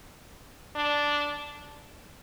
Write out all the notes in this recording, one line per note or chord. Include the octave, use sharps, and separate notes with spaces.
D4